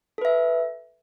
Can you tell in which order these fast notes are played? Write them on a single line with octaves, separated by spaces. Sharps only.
A4 B4 E5